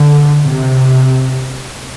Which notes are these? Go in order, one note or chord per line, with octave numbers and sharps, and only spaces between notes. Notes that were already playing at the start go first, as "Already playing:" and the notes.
Already playing: D3
C3